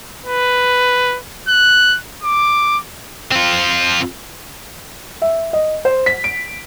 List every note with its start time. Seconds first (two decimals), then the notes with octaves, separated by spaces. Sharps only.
0.25 B4
1.48 F#6
2.23 D6
3.32 C4 F4
5.22 E5
5.53 D#5
5.85 C5
6.06 B6
6.24 D7